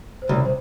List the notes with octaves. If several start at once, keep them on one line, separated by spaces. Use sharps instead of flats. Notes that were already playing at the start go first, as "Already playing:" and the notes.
C5
C2 C#4 C#5
C5